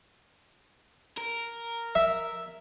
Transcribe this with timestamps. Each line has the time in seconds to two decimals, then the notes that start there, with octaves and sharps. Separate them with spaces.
1.18 A#4
1.95 E5